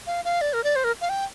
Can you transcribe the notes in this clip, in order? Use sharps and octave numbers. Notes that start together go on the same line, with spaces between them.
F5
F5
D5
A#4
D5
C5
A#4
F5
G5